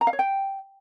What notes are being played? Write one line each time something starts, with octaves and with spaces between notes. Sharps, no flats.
A#5
F5
C#5
G5